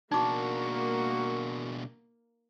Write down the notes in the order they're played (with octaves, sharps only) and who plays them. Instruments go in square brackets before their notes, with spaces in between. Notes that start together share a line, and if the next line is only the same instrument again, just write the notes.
[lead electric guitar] B2 D4 [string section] A#3 [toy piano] D#4 D6 [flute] F#4